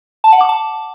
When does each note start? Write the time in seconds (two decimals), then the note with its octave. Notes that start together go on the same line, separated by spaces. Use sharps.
0.24 A5
0.32 F#5
0.41 D6
0.49 A5